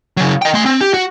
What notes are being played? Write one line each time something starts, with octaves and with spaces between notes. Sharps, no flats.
C#3 F#3
D#5 G5
A3 C6
C4
G4
F#4